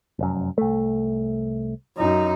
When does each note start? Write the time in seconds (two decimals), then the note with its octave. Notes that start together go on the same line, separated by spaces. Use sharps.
0.19 F1 F#2
0.58 C2 A3
1.97 F#2 D#4